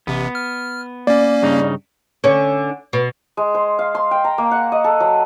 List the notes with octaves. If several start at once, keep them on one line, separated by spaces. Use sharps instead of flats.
A1 C3 B3
F6
A#3 C#4 D5
G2 C#3 D#4
D3 C#4
B2
G#3
C5
F5
C6
G5
A#5
A#3
F#5
D#5
A4
F#3